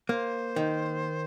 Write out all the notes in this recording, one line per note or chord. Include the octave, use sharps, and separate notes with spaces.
A#3 C5
D#3